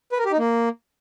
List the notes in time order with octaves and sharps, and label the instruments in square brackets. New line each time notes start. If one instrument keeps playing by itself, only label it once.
[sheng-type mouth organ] B4
A#4
G4
D#4
A#3